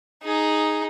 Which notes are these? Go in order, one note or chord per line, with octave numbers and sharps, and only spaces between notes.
D#4 G#4